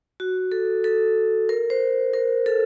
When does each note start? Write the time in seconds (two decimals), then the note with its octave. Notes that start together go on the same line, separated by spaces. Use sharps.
0.20 F#4
0.52 A4
0.84 A4
1.49 A#4
1.70 C5
2.13 A#4
2.46 A4